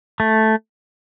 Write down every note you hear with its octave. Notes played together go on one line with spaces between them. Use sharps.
A3